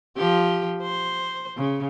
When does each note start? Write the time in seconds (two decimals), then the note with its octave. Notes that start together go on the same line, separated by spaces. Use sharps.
0.17 F3 G4
0.82 C5
1.57 C#3